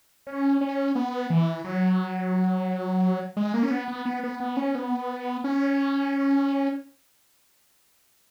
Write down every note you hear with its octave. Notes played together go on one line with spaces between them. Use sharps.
C#4
C#4
B3
E3
F#3
G#3
A#3
C#4
B3
B3
B3
B3
B3
C#4
B3
C#4